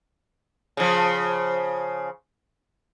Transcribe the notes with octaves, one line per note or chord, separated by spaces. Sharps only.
C#3 F3